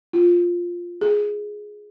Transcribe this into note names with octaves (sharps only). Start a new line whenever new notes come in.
F4
G#4